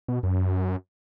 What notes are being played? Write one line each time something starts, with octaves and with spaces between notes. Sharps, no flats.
B2
F#2